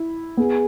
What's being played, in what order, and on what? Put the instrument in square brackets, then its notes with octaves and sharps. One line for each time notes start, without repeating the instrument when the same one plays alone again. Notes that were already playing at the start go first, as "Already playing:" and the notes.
Already playing: [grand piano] E4
[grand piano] B3 [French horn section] G#4